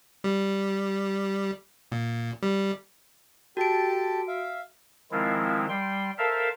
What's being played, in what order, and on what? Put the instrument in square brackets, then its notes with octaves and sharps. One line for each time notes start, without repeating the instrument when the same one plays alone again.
[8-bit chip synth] G3
A#2
G3
[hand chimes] F#4 D7 [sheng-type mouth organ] G4 A4 A5
[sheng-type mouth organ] E5 F5
[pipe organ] D#3 F3 G#3 C4 E4 F4
G3 G5 C6
A4 A#4 C5 E5 F5 A5